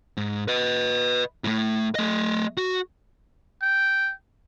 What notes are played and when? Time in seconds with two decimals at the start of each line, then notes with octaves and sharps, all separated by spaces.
0.17 G#2
0.48 B4 D#5
1.44 A2 A3
1.95 A3 D#5
2.57 F#4
3.62 G5